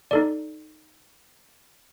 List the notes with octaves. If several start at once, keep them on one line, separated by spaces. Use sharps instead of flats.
D#4 A4 D5